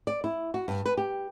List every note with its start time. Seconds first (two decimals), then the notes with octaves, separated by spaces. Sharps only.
0.07 D5
0.24 E4
0.54 F#4
0.68 G2
0.86 B4
0.97 G4